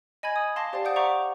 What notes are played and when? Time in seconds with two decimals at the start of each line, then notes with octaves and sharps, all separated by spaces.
0.23 D#5 G#5 B5 G#6
0.36 D#6
0.56 F5 A5 C6 D6 A#6 C7
0.73 G4 C5 D5 F5 G5 A5
0.85 C5 D5 F#5 D#6 G6 D7
0.96 E5 F#5 A#5 C#6 D6